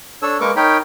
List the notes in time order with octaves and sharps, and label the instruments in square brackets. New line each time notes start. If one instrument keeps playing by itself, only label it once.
[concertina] D4 A4 C#5 E6
G#3 A#3 A#4 B4 C#6 D6
D#4 A#4 C#5 G5 B5